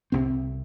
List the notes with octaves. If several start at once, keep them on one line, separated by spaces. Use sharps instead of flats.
C2 C3 C4